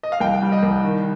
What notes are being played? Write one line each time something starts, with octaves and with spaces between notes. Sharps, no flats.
D#5
F5
C2 G5
G3
D#5
C2
D#3